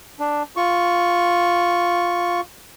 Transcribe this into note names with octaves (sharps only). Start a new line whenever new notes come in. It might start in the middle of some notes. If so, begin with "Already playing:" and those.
D4
F4 C#6